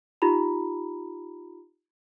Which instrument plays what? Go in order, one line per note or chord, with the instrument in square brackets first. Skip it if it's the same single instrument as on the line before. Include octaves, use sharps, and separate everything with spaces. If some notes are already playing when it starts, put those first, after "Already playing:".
[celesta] D#4 F4 G4 A#5 B5